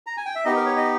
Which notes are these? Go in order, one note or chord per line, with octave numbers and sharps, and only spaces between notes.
A#5
G#5
G5
E5
B3 D#4 G4 D#5
A#4
C#5
D#5